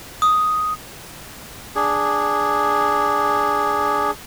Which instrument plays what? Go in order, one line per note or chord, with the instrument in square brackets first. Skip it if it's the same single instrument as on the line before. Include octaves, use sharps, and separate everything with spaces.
[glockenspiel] D#6
[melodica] D4 G#4